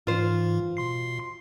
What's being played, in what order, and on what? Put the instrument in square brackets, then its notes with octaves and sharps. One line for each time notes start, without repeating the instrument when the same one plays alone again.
[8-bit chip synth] G#2 E3 [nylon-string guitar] F4 C5
[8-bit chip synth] B2 C6 C7